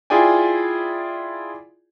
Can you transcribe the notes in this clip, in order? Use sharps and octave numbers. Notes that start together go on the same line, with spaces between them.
E4 F4 G#4 D5 G5 G#5